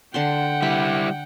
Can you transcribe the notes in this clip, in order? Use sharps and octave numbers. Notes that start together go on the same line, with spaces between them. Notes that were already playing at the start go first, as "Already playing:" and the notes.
D3 F#5 G5 A5 C6
G3 E4 B5